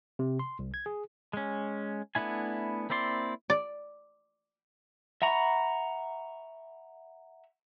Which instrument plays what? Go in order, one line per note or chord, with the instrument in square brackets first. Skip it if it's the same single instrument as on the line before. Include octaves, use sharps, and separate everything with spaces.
[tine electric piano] C3
C6
C2
G#6
G#4
[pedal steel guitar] G#3 C#4
A3 B3 D4 E4 G#5
A#3 C4 E4 D5 C6
[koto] D5
[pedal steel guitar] E5 F#5 A#5 B5 C#6